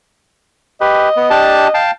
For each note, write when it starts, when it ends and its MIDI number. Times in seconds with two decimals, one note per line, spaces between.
0.81 1.09 67
0.81 1.09 71
0.81 1.79 75
1.16 1.29 59
1.30 1.68 62
1.30 1.68 67
1.30 1.68 81
1.74 1.91 77
1.74 1.91 79
1.74 1.91 81